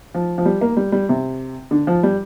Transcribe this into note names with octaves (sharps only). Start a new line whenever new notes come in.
F3
F3
G3
A#3
G3
G3
C3
D3
F3
G3